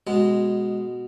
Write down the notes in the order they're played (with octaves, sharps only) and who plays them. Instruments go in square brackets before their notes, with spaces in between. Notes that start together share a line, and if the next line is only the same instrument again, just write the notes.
[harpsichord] B2 G#3